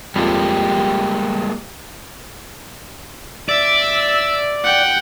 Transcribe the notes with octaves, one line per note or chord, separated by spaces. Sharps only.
F2 G3 G#3 A#3 F4 G4
D5 E5 E6
F#5 G5